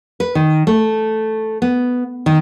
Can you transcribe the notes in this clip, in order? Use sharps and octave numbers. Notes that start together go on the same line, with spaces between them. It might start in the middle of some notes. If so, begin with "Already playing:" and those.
B4
D#3
A3
B3
D#3